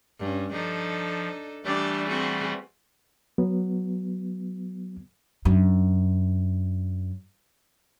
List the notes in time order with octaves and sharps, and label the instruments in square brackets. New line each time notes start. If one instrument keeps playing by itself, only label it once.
[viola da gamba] G2 C#4
[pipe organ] F3 [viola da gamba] D4 D#4 A4
[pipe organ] E3 G3 A3 [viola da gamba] D4 G4 D5
[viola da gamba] C4 F#4 G#4
[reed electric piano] F#3 B3
[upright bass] F#2 D4